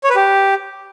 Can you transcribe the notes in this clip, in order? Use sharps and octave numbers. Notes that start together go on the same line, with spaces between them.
C#5
B4
G4